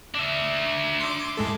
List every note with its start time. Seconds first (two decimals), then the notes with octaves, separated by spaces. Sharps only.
0.15 D4 E5
1.00 C6 D6
1.37 A2 G#3 A4